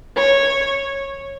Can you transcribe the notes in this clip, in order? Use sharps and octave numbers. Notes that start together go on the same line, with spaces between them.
C#5